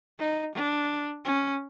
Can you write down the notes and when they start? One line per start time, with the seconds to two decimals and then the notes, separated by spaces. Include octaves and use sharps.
0.19 D#4
0.55 D4
1.25 C#4